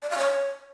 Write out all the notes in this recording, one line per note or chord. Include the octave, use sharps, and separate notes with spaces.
D5
F5
C#5